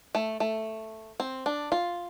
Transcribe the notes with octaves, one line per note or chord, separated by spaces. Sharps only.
A3
A3
C4
D4
F4